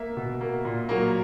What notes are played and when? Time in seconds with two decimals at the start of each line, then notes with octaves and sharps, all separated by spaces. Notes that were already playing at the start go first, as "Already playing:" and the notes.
Already playing: A#3 E5
0.17 B2
0.41 A#3
0.65 A#2
0.89 F#3 A#3